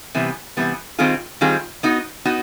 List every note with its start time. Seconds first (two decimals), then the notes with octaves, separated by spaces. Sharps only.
0.15 C3 E3 G3 B3
0.57 C3 E3 G3 B3
0.99 D#3 G3 C4 F4 G#4
1.41 D#3 G3 C4 F4 G#4
1.83 B3 D#4 F#4
2.25 B3 D#4 F#4